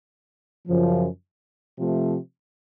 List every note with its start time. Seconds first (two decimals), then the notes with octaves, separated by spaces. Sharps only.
0.68 F#2 C#3 F3
1.78 C3 F3 A3